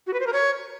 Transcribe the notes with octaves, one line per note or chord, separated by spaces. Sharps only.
F#4
B4
C5
A#4
C#5